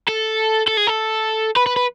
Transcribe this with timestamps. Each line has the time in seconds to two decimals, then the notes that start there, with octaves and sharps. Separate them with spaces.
0.08 A4
0.67 A4
0.77 G#4
0.87 A4
1.56 B4
1.66 B4
1.76 B4